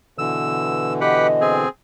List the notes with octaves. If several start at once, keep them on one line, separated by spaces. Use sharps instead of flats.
B2 D3 E3 E6
G4 B4 D#5 F#5
C4 G#4